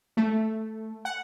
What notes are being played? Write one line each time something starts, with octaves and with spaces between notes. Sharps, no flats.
A3
F#5